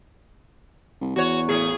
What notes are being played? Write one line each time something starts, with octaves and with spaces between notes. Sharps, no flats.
C2
E2 F#4 C#5
A2 G#4